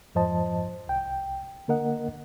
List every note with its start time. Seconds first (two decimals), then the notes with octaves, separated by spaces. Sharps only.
0.15 F2 G#2 F3 C5 D#5 A5
0.88 C2 G5
1.68 D3 A#3 A#4 D#5 F#5